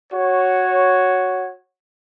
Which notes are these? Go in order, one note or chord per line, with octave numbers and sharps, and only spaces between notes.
F#4 C#5